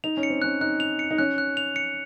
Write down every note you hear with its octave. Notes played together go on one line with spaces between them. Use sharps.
D#4 F7
C#4
C#7
C4
C#4 F#6
D#4 F#6
F7
C#7
D#4
C#4 F#6
F#6
F7
C#7